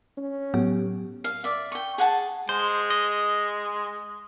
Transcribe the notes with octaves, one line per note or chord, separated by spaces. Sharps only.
C#4
A2 F#3 B3 G4
F5
D5 E5
G5 C#6
G#4 F#5 A5
G#3 C5
D#5